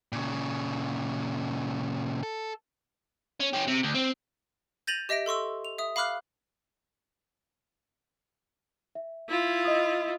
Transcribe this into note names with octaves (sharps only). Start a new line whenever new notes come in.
A#2 C#3
A4
C#4
C#4 G4
C3
D2
C4
G6 A6 A#6 D#7 F7 F#7
G4 D#5 E5 A#6 D7
A4 C6 C#6 E6
F7
E5 D#6
F5 B5 D6 F6 F#6 C7
E5
E4 F4
D#5 E5 D#6